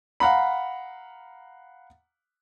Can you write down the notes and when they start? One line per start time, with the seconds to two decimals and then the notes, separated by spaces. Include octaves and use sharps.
0.20 F5 F#5 A#5 B5